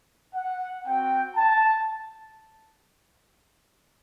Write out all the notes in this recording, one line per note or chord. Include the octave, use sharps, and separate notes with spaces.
F#5
C4 F#4 G5
A5